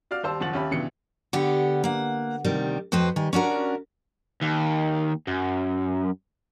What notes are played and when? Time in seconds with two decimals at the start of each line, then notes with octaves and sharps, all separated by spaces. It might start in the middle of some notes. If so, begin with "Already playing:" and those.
0.11 F#4 D5 F5 F6
0.23 D#2 G3 C5 A5 E6
0.40 F#1 D#2 F3 F#5 A6 F#7
0.53 D#2 C#4 G4 E5 B5
0.71 C#2 G2 B2 E3 C#7
1.33 D3 B3 G4
1.84 A#3 F#5
2.45 D2 C3 D#3 G3
2.92 F2 F#4 B4 C5 G5
3.16 D#3 G3 G#5
3.33 C#4 D4 F#4 A#4
4.41 D#2
5.27 F#2